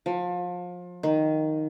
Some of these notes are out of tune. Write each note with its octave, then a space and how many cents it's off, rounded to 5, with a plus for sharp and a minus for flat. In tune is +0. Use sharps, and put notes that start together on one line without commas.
F3 +30
D#3 +0